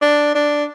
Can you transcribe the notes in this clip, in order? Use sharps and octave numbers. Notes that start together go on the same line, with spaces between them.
D4
D4